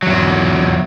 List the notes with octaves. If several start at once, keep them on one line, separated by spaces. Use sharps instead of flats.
E2 F#3